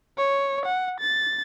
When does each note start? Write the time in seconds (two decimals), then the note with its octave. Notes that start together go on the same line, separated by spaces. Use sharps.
0.18 C#5
0.65 F#5
1.00 A6